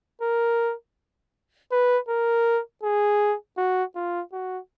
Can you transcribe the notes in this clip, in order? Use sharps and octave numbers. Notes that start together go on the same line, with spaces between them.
A#4
B4
A#4
G#4
F#4
F4
F#4